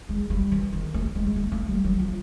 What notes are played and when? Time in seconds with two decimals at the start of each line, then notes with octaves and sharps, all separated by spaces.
0.09 G#3
0.30 G3
0.52 E3
0.72 D#3
0.94 A3
1.15 G#3
1.26 G#3
1.36 A3
1.52 A3
1.68 G3
1.84 F#3
2.00 F3